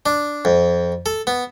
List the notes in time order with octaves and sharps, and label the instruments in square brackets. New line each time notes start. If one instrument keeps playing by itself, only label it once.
[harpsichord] D4
F2
A4
B3